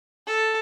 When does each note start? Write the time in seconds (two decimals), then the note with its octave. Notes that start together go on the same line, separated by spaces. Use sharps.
0.27 A4